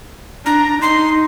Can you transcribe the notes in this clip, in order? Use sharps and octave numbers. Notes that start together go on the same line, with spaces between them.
D4 A#5
D#4 C6